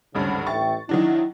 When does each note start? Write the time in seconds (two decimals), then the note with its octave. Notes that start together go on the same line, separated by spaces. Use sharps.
0.15 G#1 D2 G2 C#3
0.47 A1 E5 G5 C#6 A6
0.89 D#3 F#3 D4 E4